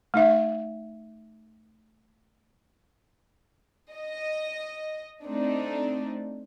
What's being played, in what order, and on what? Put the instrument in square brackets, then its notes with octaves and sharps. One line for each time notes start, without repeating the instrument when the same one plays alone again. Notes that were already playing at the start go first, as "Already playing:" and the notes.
[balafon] A3 D#4 E5
[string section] D#5
A3 C4 D4 D#4